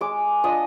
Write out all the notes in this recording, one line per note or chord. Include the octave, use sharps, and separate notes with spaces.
G#3 D6
D4 F4 D#5